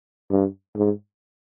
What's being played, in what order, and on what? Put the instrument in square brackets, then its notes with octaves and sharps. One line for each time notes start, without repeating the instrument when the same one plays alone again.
[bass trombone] G2
G#2